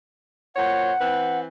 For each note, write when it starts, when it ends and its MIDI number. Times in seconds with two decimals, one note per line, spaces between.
0.56 0.91 46
0.56 0.91 72
0.56 0.91 73
0.56 1.40 78
0.99 1.46 52
0.99 1.46 60
0.99 1.46 71